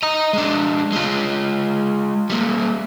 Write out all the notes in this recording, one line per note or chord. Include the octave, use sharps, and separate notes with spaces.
D#5 A#5
G#3 D4
G#3 F4
G3 A#3